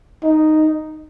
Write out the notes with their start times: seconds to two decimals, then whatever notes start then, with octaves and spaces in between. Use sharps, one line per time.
0.23 D#4